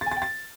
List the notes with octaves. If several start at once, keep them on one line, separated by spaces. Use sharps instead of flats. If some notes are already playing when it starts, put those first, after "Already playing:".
A6
G#5
A6
G5
A6